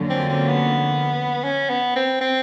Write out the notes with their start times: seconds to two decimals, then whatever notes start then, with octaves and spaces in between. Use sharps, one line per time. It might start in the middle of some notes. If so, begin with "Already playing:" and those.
Already playing: F2 D3 F#3 A#3 C#4
0.10 C4
0.29 C4
0.49 B3
1.44 C#4
1.70 B3
1.96 C4
2.21 C4